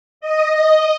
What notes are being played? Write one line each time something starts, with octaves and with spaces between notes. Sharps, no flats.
D#5